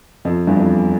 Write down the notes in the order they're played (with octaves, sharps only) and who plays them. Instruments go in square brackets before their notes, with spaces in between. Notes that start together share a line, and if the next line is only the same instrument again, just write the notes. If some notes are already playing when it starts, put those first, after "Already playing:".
[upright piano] F2
E2 G2
F2